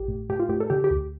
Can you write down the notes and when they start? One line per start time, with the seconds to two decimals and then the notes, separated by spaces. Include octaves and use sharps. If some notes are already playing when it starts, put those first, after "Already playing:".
Already playing: A1 G4
0.08 A2
0.29 A2 G4
0.39 F4
0.49 A2 G4
0.60 A4
0.70 D3 G4
0.84 G4
0.90 D2